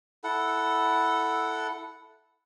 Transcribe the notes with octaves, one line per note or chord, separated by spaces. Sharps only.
E4 A4 F#5